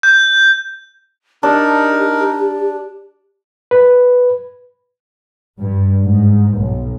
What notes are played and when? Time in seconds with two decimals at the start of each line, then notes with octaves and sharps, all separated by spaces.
0.03 G6
1.43 D4 D#4 G4 A#4
3.71 B4
5.60 G2
6.06 G#2
6.58 B1